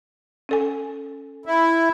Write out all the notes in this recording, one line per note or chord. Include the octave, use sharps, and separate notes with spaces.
C#4 A4 G#5
E4